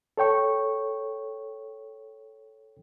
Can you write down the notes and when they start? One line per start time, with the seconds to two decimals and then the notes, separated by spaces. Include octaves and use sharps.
0.17 A4 C#5 G5 C#6